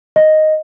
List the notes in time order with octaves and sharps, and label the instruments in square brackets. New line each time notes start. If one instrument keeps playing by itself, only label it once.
[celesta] D#5